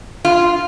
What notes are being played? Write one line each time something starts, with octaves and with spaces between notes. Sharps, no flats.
F4